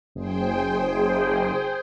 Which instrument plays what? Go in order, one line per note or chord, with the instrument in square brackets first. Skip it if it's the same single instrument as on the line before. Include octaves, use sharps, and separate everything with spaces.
[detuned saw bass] F#1 [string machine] G#4 C5 G5